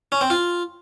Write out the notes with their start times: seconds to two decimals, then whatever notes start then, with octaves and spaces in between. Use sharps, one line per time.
0.12 C#4
0.21 C4
0.30 F4